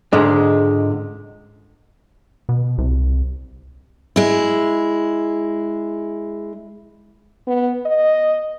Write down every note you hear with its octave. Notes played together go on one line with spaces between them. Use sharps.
C#2 G#2 D3 G#3
B2
C2
G#3 E4
B3
D#5